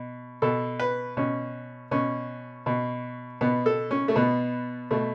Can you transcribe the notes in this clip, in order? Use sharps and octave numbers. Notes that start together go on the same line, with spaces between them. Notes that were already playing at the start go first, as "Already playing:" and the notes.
Already playing: B2
B2 A4
B4
B2 C#4
B2 C#4
B2
B2 B3
A4
C#4
A3
B2 B3
B2 A3